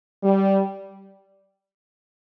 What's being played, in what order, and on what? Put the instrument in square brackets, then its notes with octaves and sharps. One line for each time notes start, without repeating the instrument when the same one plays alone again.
[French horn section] G3